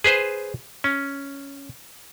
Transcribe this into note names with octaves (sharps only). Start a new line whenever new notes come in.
G#4 B4 C5
C#4